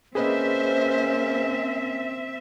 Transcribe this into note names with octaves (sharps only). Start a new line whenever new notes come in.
A#3 C4 C#4 G#4 B4 C5 D#5 E5